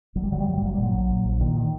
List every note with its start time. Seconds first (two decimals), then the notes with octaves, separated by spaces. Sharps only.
0.15 G1 F#3
0.24 G3
0.31 D3 F#3
0.40 G3
0.46 G2 F#3
0.58 G3
0.62 G1 F#3
0.74 G3
0.78 A#2 F#3
0.94 A#1
1.10 A#2
1.25 A#1
1.41 A#2 D#3
1.57 D#3